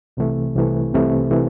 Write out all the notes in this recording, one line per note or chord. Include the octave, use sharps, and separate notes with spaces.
C2 C3 E3 A3
C2 C3 E3 A3
C2 C3 E3 A3
C3 E3 A3